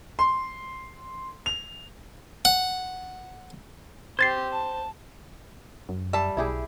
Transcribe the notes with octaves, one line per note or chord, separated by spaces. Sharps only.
C6
F7
F#5
C4 G4 C5 G#6 A6 C7
A5
F#2
G3 E5 A5
B1 E4 G4 G#4